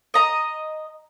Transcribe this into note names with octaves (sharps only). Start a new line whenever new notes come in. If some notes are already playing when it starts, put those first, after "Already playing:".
D#5 A#5